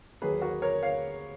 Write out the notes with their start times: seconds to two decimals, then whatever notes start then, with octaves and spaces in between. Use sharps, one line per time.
0.22 D#2 D#3 F#3 A#3 G#4 B4
0.42 F#4 A#4
0.62 A#4 C#5
0.83 C#5 F5